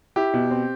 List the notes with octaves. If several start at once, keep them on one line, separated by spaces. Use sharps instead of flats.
E4 G4
B2
C4